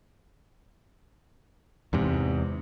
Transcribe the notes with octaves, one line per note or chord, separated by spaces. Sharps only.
E2 G#2 C3